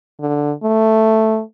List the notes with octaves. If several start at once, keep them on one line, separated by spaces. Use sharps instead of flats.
D3
A3